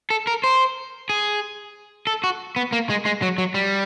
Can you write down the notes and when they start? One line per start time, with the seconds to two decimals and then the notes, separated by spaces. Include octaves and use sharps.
0.10 A4
0.27 A#4
0.44 C5
1.09 G#4
2.07 A4
2.24 F#4
2.56 B3
2.72 A#3
2.90 G#3
3.06 G#3
3.22 F#3
3.38 F#3
3.54 G3